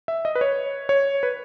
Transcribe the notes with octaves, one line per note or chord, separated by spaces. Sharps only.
E5
D#5
B4
C#5
C#5
B4